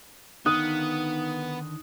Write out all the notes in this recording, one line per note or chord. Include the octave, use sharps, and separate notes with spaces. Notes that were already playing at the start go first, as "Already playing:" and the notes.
D3 D#3 B3 D#4 F5 D#6 F#6